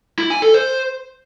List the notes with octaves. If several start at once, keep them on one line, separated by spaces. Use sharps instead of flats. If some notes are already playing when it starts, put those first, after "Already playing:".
E4
G#5
A4
C5